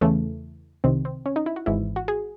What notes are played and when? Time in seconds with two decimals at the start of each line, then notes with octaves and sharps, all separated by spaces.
0.01 E2 C#3 E3 A3
0.84 C2 C3 D#3 C4
1.05 C4
1.26 C#4
1.36 D#4
1.46 E4
1.56 F#4
1.66 G#1 G#2 E3 E4
1.96 F#4
2.08 G#4